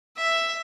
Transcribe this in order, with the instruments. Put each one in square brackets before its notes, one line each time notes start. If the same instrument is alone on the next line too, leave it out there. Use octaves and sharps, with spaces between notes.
[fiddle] E5